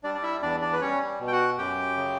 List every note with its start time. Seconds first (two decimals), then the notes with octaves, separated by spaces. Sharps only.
0.04 G3 D4 D5
0.14 D5
0.23 E4 E5
0.42 E2 D4 D5
0.61 D4 D5
0.73 B4
0.81 G3 C#4 C#5
1.20 B2
1.27 G5
1.32 F#4 F#5
1.58 F#2 G4 G5
1.97 C#3